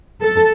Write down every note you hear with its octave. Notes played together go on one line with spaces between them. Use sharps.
A4